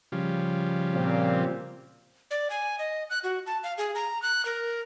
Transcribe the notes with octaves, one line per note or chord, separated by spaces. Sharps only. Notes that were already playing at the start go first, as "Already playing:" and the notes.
C#3 F3 G3
A#2 C4
D5
G#5
D#5
F#6
F#4
A5
F5
G#4
A#5
F#6
A#4